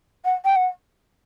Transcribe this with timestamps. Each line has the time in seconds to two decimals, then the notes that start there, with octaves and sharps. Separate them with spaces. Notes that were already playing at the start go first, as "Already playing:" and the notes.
0.25 F#5
0.45 G5
0.56 F#5